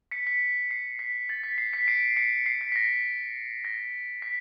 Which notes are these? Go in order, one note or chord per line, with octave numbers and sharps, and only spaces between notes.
B6 C#7
B6
C7
B6
A6
B6
C7
B6 C#7
C7 D7
B6 C#7
C7
B6
B6
A#6
A#6
B6